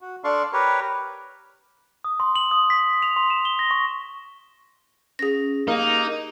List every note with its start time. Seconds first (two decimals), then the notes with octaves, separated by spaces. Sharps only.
0.01 F#4
0.24 D4 A4 D5 F5 C6 C#6
0.53 G4 A#4 B4 C#5
2.04 D#6
2.20 C6
2.36 F#7
2.51 D#6
2.70 B6
3.02 F7
3.16 C6
3.30 E7
3.45 G7
3.59 A#6
3.71 C#6
5.19 C#4 G#4 A#6
5.68 A#3 D#4 G4